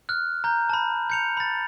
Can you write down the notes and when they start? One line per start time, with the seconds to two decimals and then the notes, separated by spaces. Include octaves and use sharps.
0.09 F6 F#6
0.44 A#5 G6
0.69 A5 B5
1.10 G6 C#7 F7
1.37 B5 A6